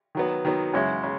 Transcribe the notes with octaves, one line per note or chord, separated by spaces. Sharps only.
D#3 F#3 B3
D#3 F#3 B3
F#2 C#3 G#3 C#4 E4
C#3